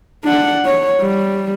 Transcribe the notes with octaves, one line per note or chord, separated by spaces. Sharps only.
D4 F#5
C#5
G3